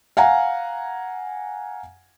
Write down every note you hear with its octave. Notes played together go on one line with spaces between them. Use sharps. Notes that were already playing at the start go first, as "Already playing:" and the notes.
F5 F#5 G#5 A#5